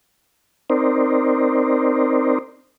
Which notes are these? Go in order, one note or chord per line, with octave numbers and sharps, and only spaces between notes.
C4 D#4 A#4 C5 D5